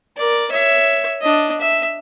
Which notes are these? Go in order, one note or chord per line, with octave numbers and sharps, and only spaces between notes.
A#4 D5
C#5 E5
D4 D#5
E5